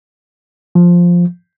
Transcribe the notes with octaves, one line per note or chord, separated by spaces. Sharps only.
F3